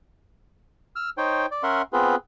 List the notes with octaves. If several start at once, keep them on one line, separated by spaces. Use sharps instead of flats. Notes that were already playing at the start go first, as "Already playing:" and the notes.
E6 F6
D#4 C5 C#5 G5
D5
C#4 A#4 E5 F#5 C6
B3 C4 F4 G#4 B4